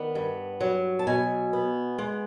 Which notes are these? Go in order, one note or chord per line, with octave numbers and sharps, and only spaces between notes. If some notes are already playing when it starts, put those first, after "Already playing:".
Already playing: D#3 B3 D5
G2
F#3
A5
B2 G#5
B3
G#3